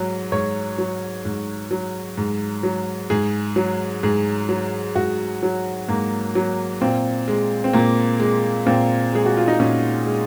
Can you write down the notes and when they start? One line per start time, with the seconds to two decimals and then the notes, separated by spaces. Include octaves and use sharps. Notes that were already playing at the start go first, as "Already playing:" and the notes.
Already playing: G#2 F#3
0.32 G#2 C#5
0.78 F#3
1.25 G#2
1.71 F#3
2.18 G#2
2.63 F#3
3.10 G#2 G#4
3.56 F#3
4.03 G#2 G#4
4.49 F#3
4.96 G#2 F#4
5.43 F#3
5.88 G#2 A#3
6.35 F#3
6.81 A#2 C4
7.28 G#3
7.64 C4
7.73 A#2 A#3
8.20 G#3
8.66 A#2 C4
9.13 G#3 G#4
9.26 F#4
9.37 F4
9.48 D#4
9.60 A#2 C#4
10.06 G#3